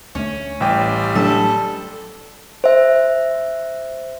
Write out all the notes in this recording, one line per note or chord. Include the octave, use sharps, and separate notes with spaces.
D2 A3 C#4
A1 G3 G5
F#3 A3 D4 A4
C5 E5